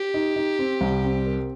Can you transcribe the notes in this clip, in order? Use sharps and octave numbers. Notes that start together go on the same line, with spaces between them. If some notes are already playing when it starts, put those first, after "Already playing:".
Already playing: G4
D#4
D#4
C4
C2
C4
A#4